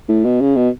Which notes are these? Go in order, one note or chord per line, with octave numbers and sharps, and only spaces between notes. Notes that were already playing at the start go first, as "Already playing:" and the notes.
A2
B2
C#3
B2